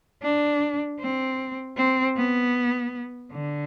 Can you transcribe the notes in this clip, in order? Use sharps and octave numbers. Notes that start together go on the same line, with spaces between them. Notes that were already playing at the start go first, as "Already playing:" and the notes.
D4
C4
C4
B3
D3